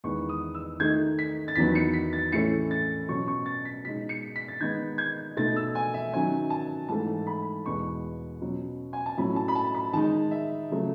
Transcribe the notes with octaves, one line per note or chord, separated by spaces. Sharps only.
E2 D#3 G#3 B3 C#6
D#6
E6
D#3 A3 D#4 G#6
B6
A6
E2 D#3 F#3 B3 B6
C#7
B6
A6
A2 E3 A3 C#4 C#7
A6
B2 F#3 C#4 C#6
C#6
A6
B6
B2 G#3 D#4 B6
C#7
B6
A6
D#3 G#3 B3 D#4 G#6
G#6
B2 A3 D#4 A6
E6
G#5
E5
D#3 F#3 C#4 G#5
A5
G#2 E3 A3 A5
B5
E2 B2 G#3 B3 C#6
B2 F#3 C#4
G#5
A5
A2 F#3 C#4 B5
A5
B5
A5
B5
D#3 G#3 D#4 A5
E5
C#3 F#3 A3